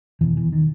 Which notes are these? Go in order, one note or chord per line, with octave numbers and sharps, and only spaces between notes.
E2 B2 E3
E3
D#3